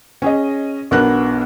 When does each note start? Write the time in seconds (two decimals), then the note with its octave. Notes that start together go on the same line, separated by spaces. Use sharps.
0.22 C#4 G#4 D#5
0.91 B1 B3 D4 A#4 F#6